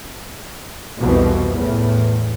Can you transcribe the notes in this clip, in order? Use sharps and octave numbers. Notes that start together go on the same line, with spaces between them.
C2 F2 B2 E3 F3
E2 A2